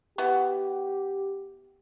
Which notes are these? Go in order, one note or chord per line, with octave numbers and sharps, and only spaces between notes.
B3 E4 F#4 G4